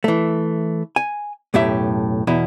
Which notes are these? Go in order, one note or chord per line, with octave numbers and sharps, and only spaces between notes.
E3 A3
G#5
B1 F#2 A2 G4 E5
E2 B2 E4